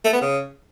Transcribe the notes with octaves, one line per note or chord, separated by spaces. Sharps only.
A3
B3
C#3